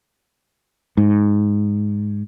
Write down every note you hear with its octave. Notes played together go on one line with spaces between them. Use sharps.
G#2